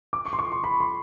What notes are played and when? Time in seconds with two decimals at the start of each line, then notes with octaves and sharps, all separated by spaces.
0.13 D6
0.26 C#6
0.33 C6
0.39 C#6
0.52 C6
0.64 B5
0.80 C6